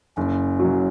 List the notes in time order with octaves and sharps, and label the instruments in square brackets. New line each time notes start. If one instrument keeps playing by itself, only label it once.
[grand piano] F#1 [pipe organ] C#4
[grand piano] F#3
F#2